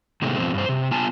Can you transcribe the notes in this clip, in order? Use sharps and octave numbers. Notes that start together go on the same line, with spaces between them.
A2 C3 D#3 G#3 A3 B3
F2 G#2 B2 F3 C4
G2 C5
C3
B3 F4 G#5 A5